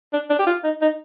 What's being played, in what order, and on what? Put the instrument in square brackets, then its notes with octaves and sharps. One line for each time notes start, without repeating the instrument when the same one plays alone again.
[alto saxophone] D4
D4
G4
F4
D#4
D#4